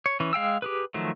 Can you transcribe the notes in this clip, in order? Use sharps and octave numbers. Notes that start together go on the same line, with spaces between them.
C#5
E3 C#4
G#3 F5 G5 E6
G4 G#4 B4
D#3 F3 F#3 A3